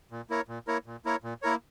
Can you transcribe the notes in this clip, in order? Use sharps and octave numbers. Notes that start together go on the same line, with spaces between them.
A#2
A#3 E4 A#4 C#5
A#2
A#3 E4 A#4 C#5
A#2
A#3 E4 A#4 C#5
A#2
A#3 E4 A#4 C#5